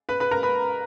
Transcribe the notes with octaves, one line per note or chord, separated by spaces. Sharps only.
B4 B5
B4 B5
A#4 A#5
B4 B5